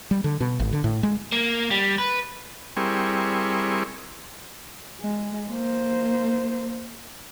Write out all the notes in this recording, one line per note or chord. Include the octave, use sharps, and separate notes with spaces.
G3
D3
B2
G#1
D3
A2
G#3
A#3
G3
B4
G3 C4 E4 G#4 A#4 C#6
G#3
A#3 C5